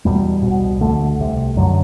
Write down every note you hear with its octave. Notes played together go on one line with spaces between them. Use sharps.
E2 B2 G3
C2 B2
D2 D3 A3
C2 C3
F#2 D3 F#3